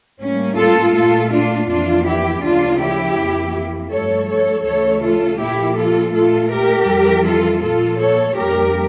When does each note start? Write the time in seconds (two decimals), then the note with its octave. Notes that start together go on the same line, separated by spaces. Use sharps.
0.21 A2 G3 A#3 C#4
0.58 F4 A4
0.95 A#2 A3 F4 A4
1.32 D4 F4
1.69 F2 E3 A#3 D4 F4
2.06 E4 G4
2.43 D2 C#3 F3 A#3 D4 F4
2.81 E4 G4
3.18 F2 E3 A#3
3.91 G2 F3 A3 A4 C#5
4.29 A4 C#5
4.66 D2 C#3 E3 A3 A4 C#5
5.03 F4 A4
5.40 A#2 F3 A#3 E4 G4
5.77 F4 A4
6.15 A#2 A3 F4 A4
6.52 G4 A#4
6.88 F2 E3 G3
7.25 F4 A4
7.63 A#2 F3 A#3 F4 A4
8.00 A4 C#5
8.37 F2 D3 G3 A#3 G4 A#4